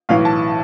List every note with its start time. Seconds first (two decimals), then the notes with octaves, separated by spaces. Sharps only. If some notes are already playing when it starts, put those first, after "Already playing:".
0.09 B1 A2 E3 F5
0.25 A5